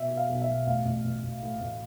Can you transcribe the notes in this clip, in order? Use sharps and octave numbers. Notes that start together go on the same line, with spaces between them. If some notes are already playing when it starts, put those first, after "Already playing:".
Already playing: B2 E5
B2
F5
B1
E5
B1
A1 F5
A1
A1
A1
A2
A1